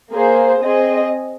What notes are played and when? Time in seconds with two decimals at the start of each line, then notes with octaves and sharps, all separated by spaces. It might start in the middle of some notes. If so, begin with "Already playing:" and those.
0.11 A#3 G#4 C5
0.61 C4 G#4 D#5